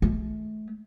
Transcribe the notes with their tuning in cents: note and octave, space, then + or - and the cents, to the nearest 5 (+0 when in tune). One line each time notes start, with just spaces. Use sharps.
A3 -35